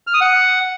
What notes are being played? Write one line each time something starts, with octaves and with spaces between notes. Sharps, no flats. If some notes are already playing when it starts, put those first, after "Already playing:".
F6
D#6
F#5